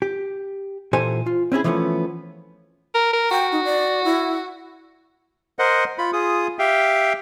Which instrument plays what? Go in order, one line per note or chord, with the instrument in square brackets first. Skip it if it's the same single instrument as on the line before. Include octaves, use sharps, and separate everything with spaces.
[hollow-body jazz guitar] G4
A#2 E3 G4 A4 C5 G#5
F4
C4 C#4 E4 G#4
E3 F3 A3 B3 C#4
[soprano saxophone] A#4
A#4
[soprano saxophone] F#4 [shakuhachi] G5
[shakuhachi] D#4
D5
E4
[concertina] A#4 C5 D#5 F#5
F4 B5
F4 G#4 D#6
G4 E5 F5 G5